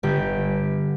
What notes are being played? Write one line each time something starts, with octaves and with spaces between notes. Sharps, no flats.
G1 G4